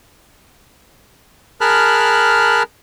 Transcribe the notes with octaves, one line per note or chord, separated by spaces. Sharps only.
G#4 A#4 A5 B5 F6 F#6